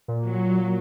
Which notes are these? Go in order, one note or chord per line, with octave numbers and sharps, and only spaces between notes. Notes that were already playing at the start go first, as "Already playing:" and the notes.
A#2
F#3